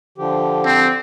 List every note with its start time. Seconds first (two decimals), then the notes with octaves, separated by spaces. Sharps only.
0.18 D3 F3 G4
0.66 C4